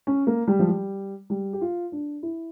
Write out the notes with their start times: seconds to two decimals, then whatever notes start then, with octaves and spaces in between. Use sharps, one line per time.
0.07 C#4
0.27 A#3
0.48 G3
0.59 F3
0.68 G3
1.30 G3
1.53 G4
1.61 F4
1.92 D4
2.23 E4